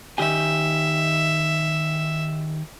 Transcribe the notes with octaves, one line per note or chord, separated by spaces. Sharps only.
D#3 G4 E5 G#5